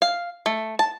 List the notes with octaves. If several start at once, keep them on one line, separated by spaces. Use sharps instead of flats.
F5
A3
A5